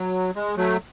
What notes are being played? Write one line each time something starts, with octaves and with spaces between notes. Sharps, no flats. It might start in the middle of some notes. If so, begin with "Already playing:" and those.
Already playing: F#3
G#3
F#3 A3